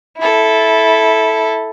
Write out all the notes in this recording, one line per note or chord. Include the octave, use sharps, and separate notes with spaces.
E4 A4